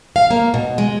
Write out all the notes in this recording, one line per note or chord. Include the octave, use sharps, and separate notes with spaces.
F5
A#3
B2
G#3